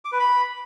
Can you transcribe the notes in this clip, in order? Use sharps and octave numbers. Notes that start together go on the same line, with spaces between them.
D6
B4
B5